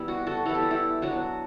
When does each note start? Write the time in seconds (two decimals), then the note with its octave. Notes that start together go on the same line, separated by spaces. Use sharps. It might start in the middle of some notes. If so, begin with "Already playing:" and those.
Already playing: E3 G3 B3 E4
0.08 F#4
0.27 F#4 A4
0.45 E3 G3 B3 E4 A4
0.55 G4
0.62 F#4
0.70 E4 G4
1.02 F#3 B3 D4 F#4